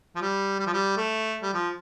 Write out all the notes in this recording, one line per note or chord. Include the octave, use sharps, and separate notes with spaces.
F3
G3
G3
F3
G3
A3
G3
F3